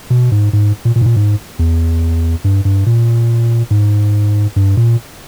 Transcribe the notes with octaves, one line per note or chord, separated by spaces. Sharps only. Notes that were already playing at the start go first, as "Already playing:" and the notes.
B2
G#2
G#2
A#2
A#2
G#2
A#2
G#2
E2
G2
G2
A#2
G#2
G2
A#2